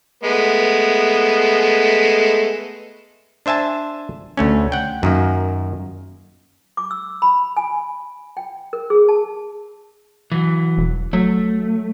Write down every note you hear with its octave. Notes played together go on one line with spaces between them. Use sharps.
G#3 A3 B3
D4 C5 E5 G#5 A5
D2 A3 C#4
F#5 G5
F#2 D#3 A#3
D6
E6
B5
G#5
G5
A#4
G#4
A5
E3 F#3
E1
F#3 A3